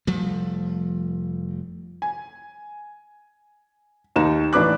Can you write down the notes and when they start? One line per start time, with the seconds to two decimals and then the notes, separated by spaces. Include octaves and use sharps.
0.07 F1 F3 G3 A3
2.02 G#5
4.16 D#2 D#4 E7
4.53 A1 D4 B4 D6 F#6